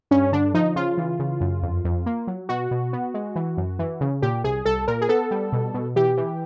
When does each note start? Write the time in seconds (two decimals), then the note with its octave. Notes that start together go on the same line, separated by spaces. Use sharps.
0.11 G2 C#4
0.32 D3 D4
0.54 F3 D#4
0.76 C#3 F4
0.98 E3
1.19 C#3
1.41 F#2
1.63 F2
1.85 F2
2.06 A#3
2.27 F#3
2.49 B2 F#4
2.71 B2
2.93 B3
3.14 G#3
3.36 E3
3.57 F#2
3.79 E3
4.01 C#3
4.22 A#2 G4
4.44 C2 G#4
4.65 C2 A4
4.88 A#2 A#4
5.01 G#4
5.09 B3 A4
5.31 G3
5.52 B2
5.74 B2
5.96 E3 G4
6.17 E3